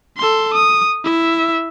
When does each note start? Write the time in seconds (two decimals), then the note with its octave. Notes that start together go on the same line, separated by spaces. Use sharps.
0.17 A4 C6
0.54 D#6
1.04 E4 E5